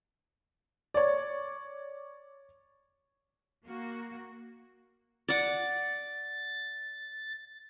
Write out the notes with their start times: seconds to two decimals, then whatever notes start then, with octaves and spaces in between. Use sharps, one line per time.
0.94 C#5 D5
3.65 A#3 F#4
5.28 D5 F#5 A6